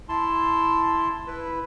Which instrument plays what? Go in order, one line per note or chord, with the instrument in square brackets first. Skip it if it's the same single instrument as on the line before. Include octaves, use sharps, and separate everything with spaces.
[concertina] E4 A5 C6
E4 B4